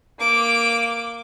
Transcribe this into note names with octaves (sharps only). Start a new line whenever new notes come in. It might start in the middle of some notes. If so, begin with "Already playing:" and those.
A#3 D6